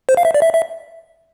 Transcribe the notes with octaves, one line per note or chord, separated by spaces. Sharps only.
C5
F5
E5
D5
E5
E5